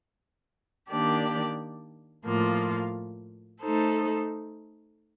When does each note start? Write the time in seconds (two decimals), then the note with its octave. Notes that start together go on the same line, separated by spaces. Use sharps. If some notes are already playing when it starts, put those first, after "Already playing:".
0.90 D#3 A#3 D4 G4 D5
2.25 A2 F3 A#3 F4
3.61 A3 D#4 A4 C5